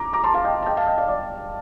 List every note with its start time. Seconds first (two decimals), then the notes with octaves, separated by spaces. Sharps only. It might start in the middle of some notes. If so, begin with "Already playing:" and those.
Already playing: A#5 D6
0.13 A#5 D6
0.24 A5 C6
0.34 F5 A5
0.44 D#5 G5
0.62 A5
0.66 D#5 G5
0.77 F5 A5
0.87 D#5 G5
0.97 D5 F5
1.08 D5